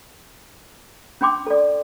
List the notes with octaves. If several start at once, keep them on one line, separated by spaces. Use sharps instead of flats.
C#4 D4 G5 C6 D6
A4 D5